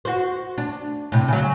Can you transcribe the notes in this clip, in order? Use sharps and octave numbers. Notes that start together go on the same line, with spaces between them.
F#4 C5
D4
A2 C3
C#3 F#3